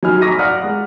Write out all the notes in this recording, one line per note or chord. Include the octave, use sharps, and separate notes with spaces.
F#3 D#4 G#5 B5 F6
A#5 C#6 D6 A#6 B6 D#7
D5 F5 F#5 D#6 F6
G#3